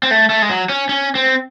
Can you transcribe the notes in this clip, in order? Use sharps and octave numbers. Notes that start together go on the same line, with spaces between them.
C4
A3
A3
G#3
F#3
C#4
C#4
C4